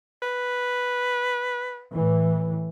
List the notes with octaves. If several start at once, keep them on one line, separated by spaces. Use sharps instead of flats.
B4
A2 E3